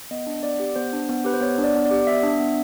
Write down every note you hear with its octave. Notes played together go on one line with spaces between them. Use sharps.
B3 D#5
D4
B3 D5
G4
B3 C5
D4
B3
G4 B4
C5
B3 C#5
D4
D5
B3
D5
G4
B3 E5
D4
B3